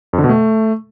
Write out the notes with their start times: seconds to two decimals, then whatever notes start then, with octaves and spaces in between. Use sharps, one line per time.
0.13 F2
0.18 D3
0.24 B2
0.29 A3